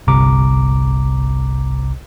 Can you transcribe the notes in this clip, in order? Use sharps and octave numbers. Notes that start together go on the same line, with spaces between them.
G1 C2 C3 A#5 D6